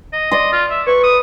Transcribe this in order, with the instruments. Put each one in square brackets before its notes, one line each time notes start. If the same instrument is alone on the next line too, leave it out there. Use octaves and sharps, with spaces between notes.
[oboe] D#5
[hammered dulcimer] D5 C6 [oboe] D#5
[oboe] F4
E5
[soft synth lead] B4 [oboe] C#6
[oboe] D#6